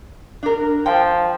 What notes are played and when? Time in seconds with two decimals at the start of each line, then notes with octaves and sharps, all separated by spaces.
0.43 D4 A#4
0.86 F3 G5